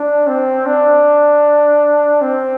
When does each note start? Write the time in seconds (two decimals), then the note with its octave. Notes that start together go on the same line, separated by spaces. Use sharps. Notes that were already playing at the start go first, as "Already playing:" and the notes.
Already playing: D4
0.27 C4
0.66 D4
2.21 C4